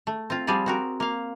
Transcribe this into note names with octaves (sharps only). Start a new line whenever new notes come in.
A3
C4 F4
F3 G3 C4 G#4 D5
C4 F#4 A#4
A#3 F5